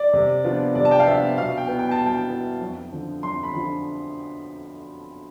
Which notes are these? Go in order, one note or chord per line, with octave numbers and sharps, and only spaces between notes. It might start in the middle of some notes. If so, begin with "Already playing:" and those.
Already playing: D5
C3
F3 B3 D4 F4
C3 D5
A5
G5
F5
F3 B3 D4 F4 E5
B2 F5
G5
B3 E4
G5
A5
B2
G5
B3 E4
F2
D3 F3
F2 C6
B5
D3 F3